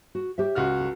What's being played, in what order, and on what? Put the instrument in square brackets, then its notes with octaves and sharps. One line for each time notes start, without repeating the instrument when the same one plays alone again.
[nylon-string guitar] F#4
G4 C#5 E5
[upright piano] C#2 F#4 F6
[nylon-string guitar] A4